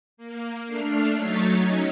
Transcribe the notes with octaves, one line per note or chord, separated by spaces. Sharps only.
A#3
A3 D4 F6 C7
F#3 A3 D#4 C#5 A6 B6
F#3 C#4 D#4